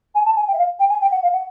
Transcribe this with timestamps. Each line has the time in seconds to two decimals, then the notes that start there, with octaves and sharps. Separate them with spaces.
0.14 G#5
0.25 A5
0.36 G#5
0.47 G5
0.53 E5
0.58 F5
0.79 G5
0.89 G#5
1.00 G5
1.11 F#5
1.22 F5
1.32 F#5